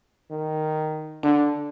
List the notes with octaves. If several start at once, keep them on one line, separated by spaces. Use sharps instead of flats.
D#3
D3 D4